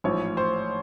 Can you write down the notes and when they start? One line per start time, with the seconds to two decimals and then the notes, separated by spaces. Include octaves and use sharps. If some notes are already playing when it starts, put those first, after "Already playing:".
0.04 A1 G#2 F3 C#5
0.37 C5